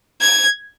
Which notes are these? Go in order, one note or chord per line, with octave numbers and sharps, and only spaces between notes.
G#6